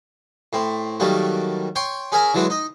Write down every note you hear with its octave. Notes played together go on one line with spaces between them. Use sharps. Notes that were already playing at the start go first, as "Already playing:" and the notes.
A2 C4
D#3 F#3 G3 A3 A#3
C#5 G5 C6 C#6
C#4 G#4 A#4 E5 G#5 A#5
D3 E3 F#3 G#3 D4 E4
D#4 D#5